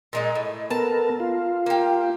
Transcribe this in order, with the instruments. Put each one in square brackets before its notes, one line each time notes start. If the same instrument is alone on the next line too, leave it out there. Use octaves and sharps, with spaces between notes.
[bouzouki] A#2 G#3 D#4
A2
[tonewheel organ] B3 A4 A#4 [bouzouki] A5
[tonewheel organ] F4
[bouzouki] A#3 G4